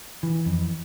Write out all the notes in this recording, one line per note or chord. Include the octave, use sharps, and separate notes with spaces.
E3
F2